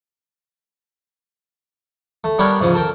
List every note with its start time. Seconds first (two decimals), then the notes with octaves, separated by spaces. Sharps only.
2.24 A3
2.38 G3 B3 D4 G4 A#4 C#5
2.61 G#2 C#3 F3
2.74 A4 A#4 G5